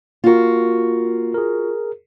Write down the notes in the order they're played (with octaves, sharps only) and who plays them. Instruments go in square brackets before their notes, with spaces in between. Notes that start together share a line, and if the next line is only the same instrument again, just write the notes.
[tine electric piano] A#3 A#4 [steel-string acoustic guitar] F4 F#4
[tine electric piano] G#4 A#4